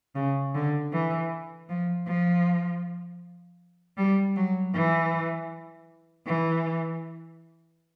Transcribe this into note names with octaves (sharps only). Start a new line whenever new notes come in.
C#3
D3
E3
F3
F3
G3
F#3
E3
E3